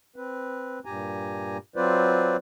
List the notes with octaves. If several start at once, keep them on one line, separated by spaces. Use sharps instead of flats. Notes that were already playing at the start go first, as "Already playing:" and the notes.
C4 B4
G2 A#2 G4 G#5 A#5
F#3 C4 F4 B4 C5 D5